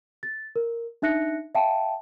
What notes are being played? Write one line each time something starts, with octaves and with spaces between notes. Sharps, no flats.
A6
A#4
D4 D#4 E5 F#6 A#6 C#7
E5 F5 G5 A5